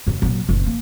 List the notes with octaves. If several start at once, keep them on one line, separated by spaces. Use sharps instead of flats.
F#2 D3
A#2 F#3
F#1 A#2
A#3